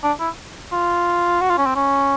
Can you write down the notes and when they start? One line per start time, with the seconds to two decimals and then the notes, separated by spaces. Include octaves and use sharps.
0.03 D4
0.20 E4
0.72 F4
1.41 F#4
1.50 F4
1.58 C#4
1.66 C4
1.75 C#4